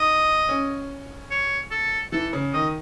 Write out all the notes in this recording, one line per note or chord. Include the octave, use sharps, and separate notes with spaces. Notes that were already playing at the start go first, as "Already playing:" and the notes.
Already playing: D#4 D#5
C#4
C#5
A4
E3 A4
C#3
D#3 D#5